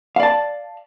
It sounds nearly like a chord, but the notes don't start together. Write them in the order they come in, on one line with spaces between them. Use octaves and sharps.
F5 D5 A5